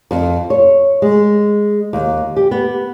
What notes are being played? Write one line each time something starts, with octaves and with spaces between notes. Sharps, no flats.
F2
C#5
G#3
D#2
G4
B3